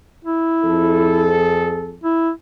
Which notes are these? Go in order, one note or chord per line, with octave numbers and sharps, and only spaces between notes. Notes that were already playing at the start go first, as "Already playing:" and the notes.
E4
F2 G#4 A4
E4